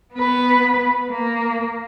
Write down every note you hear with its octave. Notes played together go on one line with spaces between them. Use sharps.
B3 B4
A#3